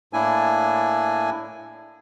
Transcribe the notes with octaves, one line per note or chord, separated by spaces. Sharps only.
A2 A#3 D4 E4 G#5